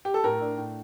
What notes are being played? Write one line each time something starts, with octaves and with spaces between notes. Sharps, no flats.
G4
A4
A2 A#4
D4
A2